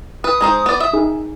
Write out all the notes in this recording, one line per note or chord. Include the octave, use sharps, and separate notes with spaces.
B4 D#6
G#3 D#4 C5
B3 D5
E5
D#4 G#4